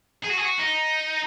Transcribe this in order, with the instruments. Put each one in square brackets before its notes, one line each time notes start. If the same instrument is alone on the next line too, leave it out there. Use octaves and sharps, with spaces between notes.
[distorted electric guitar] G#4
F#4
G#4
F#4
D#4